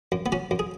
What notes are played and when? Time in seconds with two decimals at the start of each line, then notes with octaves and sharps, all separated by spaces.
0.12 F#2
0.26 B3
0.32 F#3 C#4
0.51 F#2
0.59 G#4